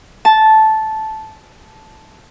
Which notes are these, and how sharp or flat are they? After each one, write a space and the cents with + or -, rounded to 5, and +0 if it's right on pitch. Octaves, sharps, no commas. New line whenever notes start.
A5 -10